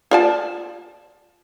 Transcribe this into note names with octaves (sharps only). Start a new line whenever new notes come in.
F4 D5 A5